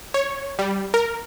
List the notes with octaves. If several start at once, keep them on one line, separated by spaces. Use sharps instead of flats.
C#5
G3
A#4